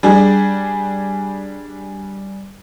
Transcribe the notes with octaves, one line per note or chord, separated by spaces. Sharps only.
G3 D4 G#4